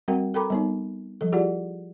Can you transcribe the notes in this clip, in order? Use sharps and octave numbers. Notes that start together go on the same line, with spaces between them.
G3 C4 F#4 A#4 F#5 G5
A4 A#4 G5 A#5 B5 D6
G3 B3 D#4
F3 G3 A4
E4 F4 G4 G#4 D5 F#5